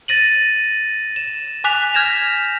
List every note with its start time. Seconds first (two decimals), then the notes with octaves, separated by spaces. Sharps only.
0.08 A6 A#6 D#7 F#7
1.16 E7
1.64 G#5 D6 F#6 B6 F7
1.95 F6 G6 G#6 A#6 B6 E7